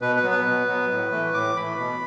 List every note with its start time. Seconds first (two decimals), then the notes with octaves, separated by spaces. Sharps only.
0.01 B2 B4
0.16 B4
0.23 F#3 B3
0.31 B4
0.45 B2
0.68 F#3 B3
0.91 A2
1.12 E3 A3
1.34 A2 D6
1.56 E3 A3 B5
1.78 B2